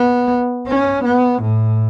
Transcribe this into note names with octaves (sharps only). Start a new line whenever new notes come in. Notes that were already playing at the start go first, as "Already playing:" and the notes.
Already playing: B3
C#4
B3
A2